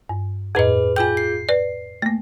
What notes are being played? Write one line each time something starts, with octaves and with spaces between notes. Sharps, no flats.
G2
F2 A2 G#4 B4 D#5
F4 G#4 G5 G#5 G6
C7
B4 D5
A3 A#3